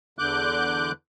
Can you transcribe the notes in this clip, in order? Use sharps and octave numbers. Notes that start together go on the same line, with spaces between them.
E2 D3 D6 F#6 G6